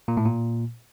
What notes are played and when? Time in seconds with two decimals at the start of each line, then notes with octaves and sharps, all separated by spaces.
0.08 A#2
0.17 A2
0.26 A#2